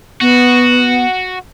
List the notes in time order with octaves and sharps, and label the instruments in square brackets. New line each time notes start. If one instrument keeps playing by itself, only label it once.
[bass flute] B3 [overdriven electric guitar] F#4